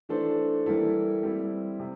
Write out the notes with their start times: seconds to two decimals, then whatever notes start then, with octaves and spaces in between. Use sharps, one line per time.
0.09 E3 A3 D4 A4 C5
0.66 E3 G3 A#3 E4 A4
1.23 G3 C4 E4
1.79 C3